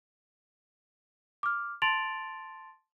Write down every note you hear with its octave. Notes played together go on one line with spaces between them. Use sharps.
D6 F6
A5 C6 A6 D7 F7 F#7